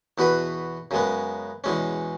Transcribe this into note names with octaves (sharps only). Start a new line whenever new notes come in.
E2 B2 B3 F#4 B4
F#2 C#3 G#3 B3
E2 B2 G#3 C#4